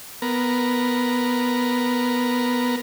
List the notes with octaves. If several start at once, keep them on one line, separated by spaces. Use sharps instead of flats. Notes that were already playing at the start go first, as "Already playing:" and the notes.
B3 A#4